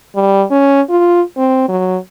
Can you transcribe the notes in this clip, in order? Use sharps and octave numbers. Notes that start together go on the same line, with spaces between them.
G3
C#4
F4
C4
F#3